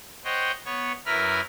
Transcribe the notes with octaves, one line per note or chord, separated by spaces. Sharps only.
C5 C#5 D#5 F#5 G5
B3 C#5 C#6
F#2 E4 A#4 B4 B5 F6